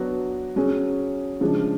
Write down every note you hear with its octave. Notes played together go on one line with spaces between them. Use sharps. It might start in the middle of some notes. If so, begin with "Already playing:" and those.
Already playing: F#3 B3 D4 F#4
F#3 C#4 G#4
C#3 F3 G#3 D4